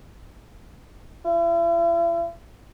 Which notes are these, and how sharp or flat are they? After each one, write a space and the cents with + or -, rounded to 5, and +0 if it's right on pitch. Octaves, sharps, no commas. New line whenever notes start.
E4 +45